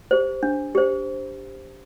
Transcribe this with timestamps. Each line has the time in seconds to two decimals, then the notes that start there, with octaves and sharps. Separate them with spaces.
0.11 G4 C5
0.43 D4
0.75 G4 C5